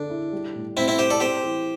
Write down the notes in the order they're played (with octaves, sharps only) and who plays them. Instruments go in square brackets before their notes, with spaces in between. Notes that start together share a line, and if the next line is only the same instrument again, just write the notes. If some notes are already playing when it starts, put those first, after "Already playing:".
Already playing: [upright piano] D3 A4 [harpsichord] D4
[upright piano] E4
G3
A2
[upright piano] A2 [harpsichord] C4 E4
[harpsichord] C4 E4
[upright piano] E4 [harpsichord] G4 C5
[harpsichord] A4 D5
[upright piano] C4 [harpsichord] G4 C5
[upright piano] E3